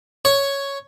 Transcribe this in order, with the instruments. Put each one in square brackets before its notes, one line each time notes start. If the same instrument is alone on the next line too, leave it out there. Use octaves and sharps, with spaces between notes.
[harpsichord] C#5